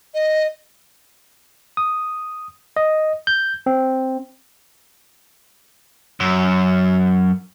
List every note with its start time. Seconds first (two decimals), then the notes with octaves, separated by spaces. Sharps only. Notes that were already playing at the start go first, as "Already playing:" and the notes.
0.14 D#5
1.77 D#6
2.77 D#5
3.27 G6
3.66 C4
6.20 F#2